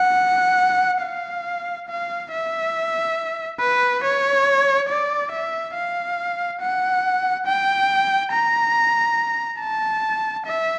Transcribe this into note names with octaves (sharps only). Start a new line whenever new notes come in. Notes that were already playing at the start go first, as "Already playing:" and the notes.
Already playing: F#5
F5
F5
E5
B4
C#5
D5
E5
F5
F#5
G5
A#5
A5
E5